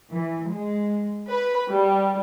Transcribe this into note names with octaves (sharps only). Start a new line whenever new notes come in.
E3
G#3
B4
G3